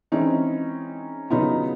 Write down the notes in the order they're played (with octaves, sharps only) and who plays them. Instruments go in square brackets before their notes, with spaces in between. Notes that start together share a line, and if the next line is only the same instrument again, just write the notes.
[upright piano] E3 G#3 C4 [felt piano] C#4 D#4
[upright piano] C#3 F#3 B3 [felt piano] D#4 F4